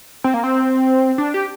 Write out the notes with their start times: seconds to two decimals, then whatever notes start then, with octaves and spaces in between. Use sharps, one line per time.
0.24 C4
0.34 A#3
0.44 C4
1.18 D4
1.34 G4